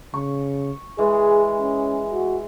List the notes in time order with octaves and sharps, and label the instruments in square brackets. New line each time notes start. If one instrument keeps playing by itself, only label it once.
[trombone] C#3 [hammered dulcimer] C#6
[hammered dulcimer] E3 G#3 [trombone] G#4
[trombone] C#4
F#4